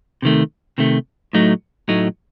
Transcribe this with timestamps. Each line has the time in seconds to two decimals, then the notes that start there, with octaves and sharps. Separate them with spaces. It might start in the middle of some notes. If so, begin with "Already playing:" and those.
0.22 C3 D#3 A3
0.78 C3 D#3 A3
1.33 A2 F#3 A3 D#4
1.88 A2 F#3 A3 D#4